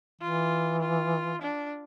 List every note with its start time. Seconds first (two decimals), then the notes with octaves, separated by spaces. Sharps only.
0.21 E3 F4
0.82 F4
1.42 D4